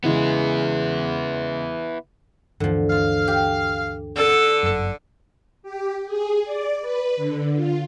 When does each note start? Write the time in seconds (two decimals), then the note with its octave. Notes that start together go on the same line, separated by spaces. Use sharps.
0.04 C#3 E3 G#3 B3 E4
2.60 D2 G2 D3 E3 F3
2.90 F5
3.28 G4
4.16 D3 A4
4.63 G1 F#2
5.63 G4
6.06 G#4
6.44 D5
6.82 B4
7.17 D3
7.56 F4